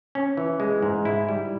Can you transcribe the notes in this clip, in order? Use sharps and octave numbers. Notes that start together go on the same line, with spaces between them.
C#4
E3
G#3
G#2
E4
G3